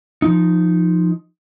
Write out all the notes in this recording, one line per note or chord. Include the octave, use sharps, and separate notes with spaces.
F3 D#4